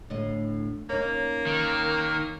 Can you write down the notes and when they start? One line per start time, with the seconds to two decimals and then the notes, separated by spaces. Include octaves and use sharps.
0.10 D2 A2 D#5
0.90 A#3 C#4 D#4
1.47 D#3